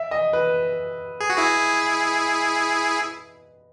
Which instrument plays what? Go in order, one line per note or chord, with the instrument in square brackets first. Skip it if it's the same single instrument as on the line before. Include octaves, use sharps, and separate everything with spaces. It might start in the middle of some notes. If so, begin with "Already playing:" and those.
Already playing: [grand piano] E5
D#5
B4
[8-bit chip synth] G#4
F#4
E4 G#4